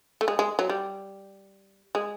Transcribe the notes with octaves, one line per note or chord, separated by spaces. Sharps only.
A3
G#3
G#3
F#3
G3
G#3